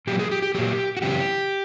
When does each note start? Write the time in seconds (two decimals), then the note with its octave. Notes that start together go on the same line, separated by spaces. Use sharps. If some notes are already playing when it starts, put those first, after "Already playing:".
0.07 A#2 F#3 G4
0.19 G#4
0.31 G4
0.42 G4
0.55 A#2 F#3 G4
0.97 F#4
1.02 F#2 C#3 E3 G4